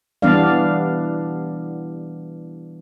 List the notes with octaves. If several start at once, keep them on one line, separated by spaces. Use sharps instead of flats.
E3 G3 B3 D4 D5 F5